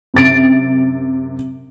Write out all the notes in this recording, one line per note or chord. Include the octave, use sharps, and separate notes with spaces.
F#2 C3 A6 D7